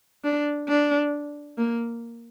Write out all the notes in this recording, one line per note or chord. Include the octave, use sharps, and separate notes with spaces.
D4
D4
A#3